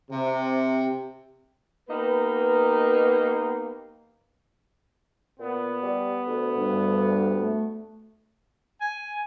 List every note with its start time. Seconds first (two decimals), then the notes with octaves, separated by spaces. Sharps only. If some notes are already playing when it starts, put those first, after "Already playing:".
0.11 C3
1.88 A#3 B3 D#4 G4 B4
5.39 A#2 B3
5.82 G3
6.27 D2
6.56 G2
7.39 A3
8.81 G#5